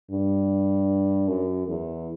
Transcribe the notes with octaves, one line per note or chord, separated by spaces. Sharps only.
G2
F#2
E2